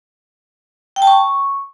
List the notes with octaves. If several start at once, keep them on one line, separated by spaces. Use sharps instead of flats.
G5
A5
C#6